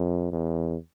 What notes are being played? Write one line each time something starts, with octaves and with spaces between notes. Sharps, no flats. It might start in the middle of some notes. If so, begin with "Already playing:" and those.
Already playing: F2
E2